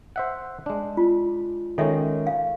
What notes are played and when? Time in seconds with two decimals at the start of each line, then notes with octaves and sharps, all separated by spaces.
0.16 C5 E5 F#5
0.66 G#3 D4
0.97 F4
1.78 D#3 G#3 C#4 A4 C#5 E5
2.27 F5